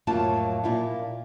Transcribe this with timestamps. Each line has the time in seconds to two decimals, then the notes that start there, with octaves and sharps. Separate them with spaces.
0.07 F2 A2 F#3 A#3 F4 A5
0.64 A#2 E4 F4